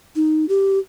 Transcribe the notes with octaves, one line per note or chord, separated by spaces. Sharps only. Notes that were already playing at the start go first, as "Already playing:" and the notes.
D#4
G4